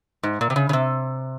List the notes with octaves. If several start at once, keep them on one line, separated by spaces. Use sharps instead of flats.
G#2
A#2
C3
C#3
C#3
C3